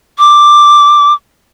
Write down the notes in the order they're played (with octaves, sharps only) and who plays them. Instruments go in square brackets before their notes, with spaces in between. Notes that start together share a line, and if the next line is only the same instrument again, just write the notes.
[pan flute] D6